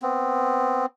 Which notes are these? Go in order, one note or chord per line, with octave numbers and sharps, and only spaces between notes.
B3 C4